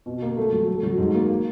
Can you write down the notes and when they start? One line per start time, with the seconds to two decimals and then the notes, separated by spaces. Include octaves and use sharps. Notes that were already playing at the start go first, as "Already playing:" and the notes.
0.06 B2
0.22 A#3
0.37 A3
0.53 F#3
0.68 A3
0.83 F#3
0.98 G#2
1.14 A#3
1.29 A#3